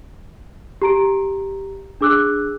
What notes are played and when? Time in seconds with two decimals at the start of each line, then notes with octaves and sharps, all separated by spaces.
0.82 G4 A#5 D7
2.01 D4 G#4 D6 E6 F#6